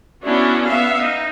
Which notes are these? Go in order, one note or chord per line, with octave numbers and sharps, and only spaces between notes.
B3 C#4 D4 E4 F#4
B3 E5 F5
D#4